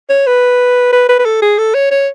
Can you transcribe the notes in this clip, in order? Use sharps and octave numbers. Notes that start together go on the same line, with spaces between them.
C#5
B4
B4
B4
B4
A4
G#4
A4
C#5
C#5